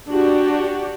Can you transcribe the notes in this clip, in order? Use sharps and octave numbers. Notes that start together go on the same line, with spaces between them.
D4 F#4 G4